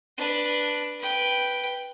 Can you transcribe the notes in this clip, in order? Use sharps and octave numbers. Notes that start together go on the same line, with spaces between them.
D4 B4
B4 G5